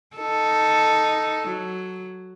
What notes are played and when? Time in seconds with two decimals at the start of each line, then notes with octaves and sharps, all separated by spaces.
0.17 D#4 A4
1.48 F#3